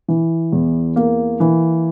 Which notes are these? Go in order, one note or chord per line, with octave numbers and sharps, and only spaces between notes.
E3
E2
A#3
E3